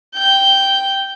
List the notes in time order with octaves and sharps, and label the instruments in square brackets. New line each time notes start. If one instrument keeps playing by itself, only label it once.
[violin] G5 G6